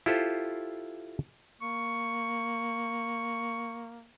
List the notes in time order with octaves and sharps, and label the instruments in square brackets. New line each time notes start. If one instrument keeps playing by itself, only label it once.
[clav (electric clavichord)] E4 F4 G4 A4 C5
[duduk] A#3 [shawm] C#6